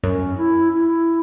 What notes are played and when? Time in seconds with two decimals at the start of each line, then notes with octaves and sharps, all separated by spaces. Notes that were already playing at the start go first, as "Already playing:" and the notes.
0.04 F#2 C#4
0.38 E4
0.72 E4